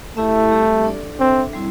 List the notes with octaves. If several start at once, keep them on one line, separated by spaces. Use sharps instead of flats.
A3 E4 G4 E5
G3 C4 G4 E5
D4 A4 D5
C4 D4 A4 E5
G3 C4 E4